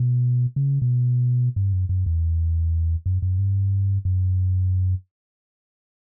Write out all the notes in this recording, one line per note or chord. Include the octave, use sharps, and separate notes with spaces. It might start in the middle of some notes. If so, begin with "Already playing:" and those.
Already playing: B2
C#3
B2
G2
F#2
F#2
E2
F#2
F#2
G2
F#2